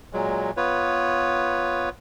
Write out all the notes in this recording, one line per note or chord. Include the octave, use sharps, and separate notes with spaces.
A#2 F#3 G#3
B3 F4 B4 C#5